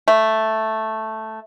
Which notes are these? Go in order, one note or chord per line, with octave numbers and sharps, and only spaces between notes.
A3